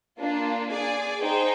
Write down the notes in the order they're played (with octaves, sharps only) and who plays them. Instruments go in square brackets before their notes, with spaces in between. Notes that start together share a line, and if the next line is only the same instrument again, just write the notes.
[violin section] A#3 D4 F4
G#4 D5 G#5
D#4 G#4 C5 G5